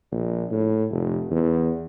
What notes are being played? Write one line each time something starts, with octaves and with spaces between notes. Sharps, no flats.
A#1
A2
F1
E2